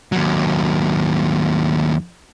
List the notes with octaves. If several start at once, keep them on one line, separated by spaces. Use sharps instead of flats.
D#2 F#3